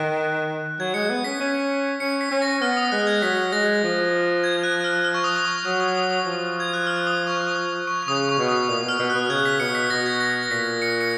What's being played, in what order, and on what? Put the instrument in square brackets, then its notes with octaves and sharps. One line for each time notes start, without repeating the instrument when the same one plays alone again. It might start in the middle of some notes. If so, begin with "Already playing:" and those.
Already playing: [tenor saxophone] D#3 [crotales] F#6
[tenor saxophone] F#3 [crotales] G#6
[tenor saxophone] G#3 [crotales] C#7
[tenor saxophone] B3
[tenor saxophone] C#4 [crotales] B6
[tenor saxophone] C#4 [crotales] B6
[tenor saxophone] C#4 [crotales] C#7
[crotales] B6
[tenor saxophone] C#4 [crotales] B6
[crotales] A#6
[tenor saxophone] B3 [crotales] F6
[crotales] D#6
[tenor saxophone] G#3 [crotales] F#6
[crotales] G#6
[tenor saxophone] F#3 [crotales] B6
[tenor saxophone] G#3 [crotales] A#6
[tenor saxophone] F3
[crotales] G#6
F#6
F6
F6
C#6
D#6
D#6
C#6
[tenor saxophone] F#3 [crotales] D#6
[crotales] D#6
D#6
D#6
[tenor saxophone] F3
[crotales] G#6
F#6
F6
D#6
C#6
D#6
C#6
C#6
[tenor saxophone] C#3 [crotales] D#6
[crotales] C#6
[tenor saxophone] B2
[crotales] D#6
[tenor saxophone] A#2 [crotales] D#6
[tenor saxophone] B2 [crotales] F6
[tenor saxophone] B2
[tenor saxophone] B2 [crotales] F#6
[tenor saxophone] C#3 [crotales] G#6
[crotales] B6
[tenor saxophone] B2 [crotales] C#7
[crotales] B6
[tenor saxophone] B2 [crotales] A#6
[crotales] G#6
A#6
A#6
[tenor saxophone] A#2 [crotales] B6
[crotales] C#7
C#7